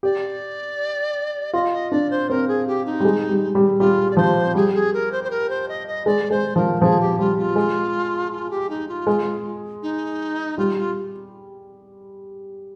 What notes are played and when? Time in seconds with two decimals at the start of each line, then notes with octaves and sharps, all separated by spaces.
0.03 G4 D5
1.53 F4 D#5
1.72 D#5
1.91 D4 D5
2.10 C5
2.29 C4 A#4
2.47 G#4
2.67 G4
2.85 D#4
3.00 G3
3.05 G#3
3.29 G3
3.55 G3
3.79 G3 F4
4.10 D5
4.17 F3 C5
4.55 G3 G#4
4.74 G#4
4.93 A#4
5.11 C5
5.23 C5
5.30 A#4
5.49 C5
5.68 D#5
5.87 D#5
6.06 G#3 D5
6.30 G#3 C5
6.56 F3 A#4
6.81 F3 G#4
7.00 G4
7.18 G3 F4
7.38 F4
7.56 G#3
8.32 F4
8.50 G4
8.69 D#4
8.88 F4
9.07 G#3
9.82 D#4
10.57 G3 F4
10.77 F4